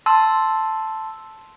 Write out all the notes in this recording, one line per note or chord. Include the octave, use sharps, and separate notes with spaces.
A5 C6 E6